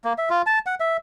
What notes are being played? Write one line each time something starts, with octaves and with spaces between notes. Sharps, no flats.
A#3
E5
F4
A5
F#5
E5